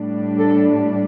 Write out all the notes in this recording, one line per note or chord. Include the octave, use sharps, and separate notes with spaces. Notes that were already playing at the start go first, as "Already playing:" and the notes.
Already playing: A2 G3 D4
A4